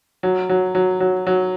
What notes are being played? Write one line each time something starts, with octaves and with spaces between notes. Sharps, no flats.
F#3
F#3
F#3
F#3
F#3